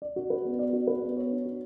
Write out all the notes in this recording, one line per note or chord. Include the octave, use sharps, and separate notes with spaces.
D5
F#4
B4
B3
D5
F#4
B4
B3
C#5
D4
F#4